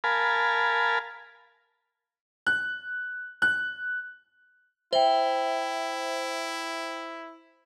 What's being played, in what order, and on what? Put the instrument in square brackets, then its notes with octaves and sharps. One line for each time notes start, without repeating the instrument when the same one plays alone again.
[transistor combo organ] A#4 F5 G#5 A5 B5
[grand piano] F#6
F#6
[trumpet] E4 [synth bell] C5 [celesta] E5 G5